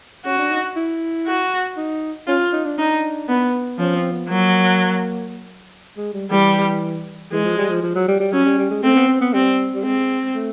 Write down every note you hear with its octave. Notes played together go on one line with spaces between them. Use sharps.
C#4 F#4
D4
D#4
E4
F#4
D#4
C#4 F4
D#4
D4
D4 D#4
B3
F3 C#4
C4
B3
F#3 A#3
G#3
G3
E3 G3
E3 G#3
F3
G3
F3
F3
F#3
G3
G3
F#3 C#4
G3
G3
G#3
A3 C4
B3
C4
B3
G3 C4
G3
G#3 C4
A3